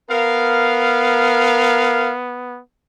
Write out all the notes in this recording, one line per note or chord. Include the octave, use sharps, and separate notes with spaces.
B3 A#4 F5